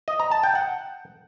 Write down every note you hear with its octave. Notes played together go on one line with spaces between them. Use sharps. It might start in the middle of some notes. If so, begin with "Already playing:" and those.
D#5
A#5
A5
G5
F#5